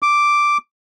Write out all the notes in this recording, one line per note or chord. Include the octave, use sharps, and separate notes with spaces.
D6